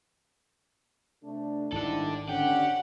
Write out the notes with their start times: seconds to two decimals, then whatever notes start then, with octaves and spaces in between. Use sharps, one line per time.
1.24 C3 A3 D4
1.72 G#1 D#3 G3 D4 E4 A4
2.29 D3 C#4 D4 G4 F#5